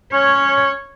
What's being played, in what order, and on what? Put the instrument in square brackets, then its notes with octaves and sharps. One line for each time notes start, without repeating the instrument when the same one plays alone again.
[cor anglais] C#4 [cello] C#5